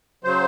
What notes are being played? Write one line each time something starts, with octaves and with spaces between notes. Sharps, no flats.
C#3 F#3 C5